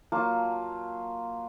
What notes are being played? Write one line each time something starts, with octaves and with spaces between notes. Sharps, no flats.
F#3 A#3 F4 A5